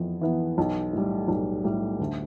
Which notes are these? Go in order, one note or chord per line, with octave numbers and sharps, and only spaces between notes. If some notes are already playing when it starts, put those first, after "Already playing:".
Already playing: F2 E3 B3 E4
E3 B3 E4
B1
A2 G3
B1
A2 G3
D2